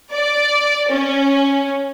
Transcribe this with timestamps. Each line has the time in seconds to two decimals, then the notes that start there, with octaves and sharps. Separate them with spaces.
0.12 D5
0.91 C#4